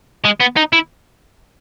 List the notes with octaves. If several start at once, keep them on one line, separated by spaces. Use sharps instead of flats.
G#3
B3
D#4
E4